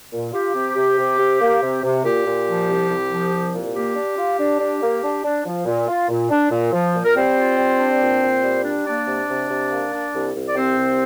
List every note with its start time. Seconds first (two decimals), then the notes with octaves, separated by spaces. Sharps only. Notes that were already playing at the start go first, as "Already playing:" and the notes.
0.12 A#2
0.33 F4 G4
0.55 C3
0.76 C3
0.98 C3
1.18 C3
1.40 A#3
1.61 C3
1.83 C3
2.03 A#2 G4
2.26 A#2
2.46 F3
2.67 C2
2.89 C2
3.10 F3
3.32 C2
3.53 A#2
3.74 A#3 G4
3.96 D4
4.17 F4
4.38 D4
4.59 D4
4.81 A#3
5.02 D4
5.24 D4
5.45 F3
5.66 A#2
5.88 F4
6.09 A#2
6.30 D4
6.51 A#2
6.73 F3
6.94 A#2
7.04 A#4
7.15 G3 C4 C5
7.36 F4
7.58 G3
7.79 D4
8.00 A#2
8.22 A#2
8.43 G3
8.64 D4
8.86 A#3 D4 D5
9.07 C3
9.28 C3
9.49 C3
9.71 A#3
9.92 D4
10.13 C2
10.35 C2
10.47 D5
10.56 C3 C4 C5
10.77 C2